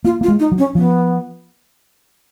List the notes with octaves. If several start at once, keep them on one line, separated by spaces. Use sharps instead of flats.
A#3 F4
A#3 F4
G#3
D#4
F#3
C#4
F3 B3